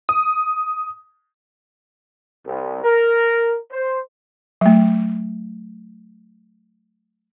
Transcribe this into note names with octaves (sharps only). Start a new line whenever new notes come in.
D#6
C2
A#4
C5
F#3 A3